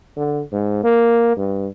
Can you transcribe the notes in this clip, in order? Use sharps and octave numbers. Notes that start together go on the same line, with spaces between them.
D3
G#2
A#3
G2